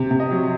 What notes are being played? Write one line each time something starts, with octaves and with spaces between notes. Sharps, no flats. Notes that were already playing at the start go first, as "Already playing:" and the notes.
Already playing: C3
C3
D#5
F#3